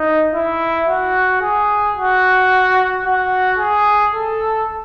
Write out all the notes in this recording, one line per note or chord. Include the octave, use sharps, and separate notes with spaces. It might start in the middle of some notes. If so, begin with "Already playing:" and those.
Already playing: D#4
E4
F#4
G#4
F#4
F#4
G#4
A4